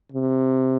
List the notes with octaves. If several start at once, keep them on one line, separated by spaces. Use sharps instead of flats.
C3